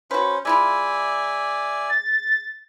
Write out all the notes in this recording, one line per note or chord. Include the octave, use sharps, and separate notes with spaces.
C#4 F#4 B4 C5
G#3 E4 F4 D5 E5 G#5
A6